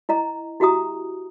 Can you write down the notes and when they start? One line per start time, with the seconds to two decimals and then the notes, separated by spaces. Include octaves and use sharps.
0.09 E4 D#5 A#5
0.60 E4 F#4 G4 E5 A#5 D#6